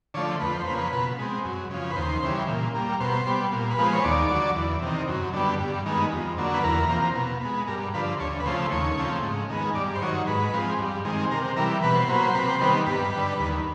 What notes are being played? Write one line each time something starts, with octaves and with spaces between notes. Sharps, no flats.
D3 F3 A3 C#5
F2 B4
C5
C#3 F3 A#3 B4
B2
G#3 C4
F#2
C#3 F3
B4
D#2 C5
C#3 E3 G3
A#2
G3 A#3
B2 C5
G3 B3
A#2
B4
F3 G#3 B3 C5
C#5
D#2 D5
D3 F#3
E2
C3 D#3
F#2
D3 G3 B3
G2
D#3 G#3 B3
F2
D3 F#3 A#3
B4
E2 A#4
C3 F3 A#3
B2
G#3 B3
G2 A#4
D3 F3 B4
D2 C#5
B4
C#3 F3 A3 C5
D#2 C#5
C#3 F3 A3 C4
G#2
D#3 G#3 B3
G2 D5
C5
D#3 F#3 C#5
G#2 B4
F3 G#3 C4
G2
D#3 G#3 C4
C3 A#4
E3 G3 A#4
B2 B4
C5
F#3 A#3 B4
C5
C3 B4
C5
D#3 G3 B3 B4
G2 B4
D3 G3
D#2